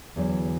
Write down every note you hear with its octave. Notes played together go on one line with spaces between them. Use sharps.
E2 D3 F#3